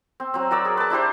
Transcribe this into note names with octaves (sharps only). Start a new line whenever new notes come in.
C4
F#3 C4
F#4 A#4 D5 E6
G#4
B4 A5
D4 E4 G4 C5